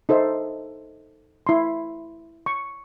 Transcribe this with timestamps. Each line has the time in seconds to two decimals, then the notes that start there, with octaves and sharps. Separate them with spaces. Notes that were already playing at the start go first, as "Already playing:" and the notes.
0.09 D#4 A4 C5 E5
1.47 E4 C6
2.46 C#6